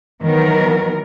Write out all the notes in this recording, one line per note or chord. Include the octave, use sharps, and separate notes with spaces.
D#3 E3 F#3 B3 A#4